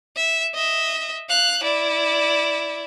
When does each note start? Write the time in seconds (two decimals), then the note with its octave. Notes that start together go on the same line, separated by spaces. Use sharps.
0.16 E5
0.54 D#5 E5
1.29 F5 F#6
1.63 E4 D5